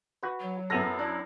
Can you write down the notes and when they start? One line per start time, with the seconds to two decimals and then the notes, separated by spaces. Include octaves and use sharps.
0.23 F#4 B4
0.40 F#3
0.70 F#2 B3 E4 A4 A#6
0.99 D4 E4